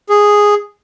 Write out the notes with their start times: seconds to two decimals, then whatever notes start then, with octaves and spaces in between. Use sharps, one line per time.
0.09 G#4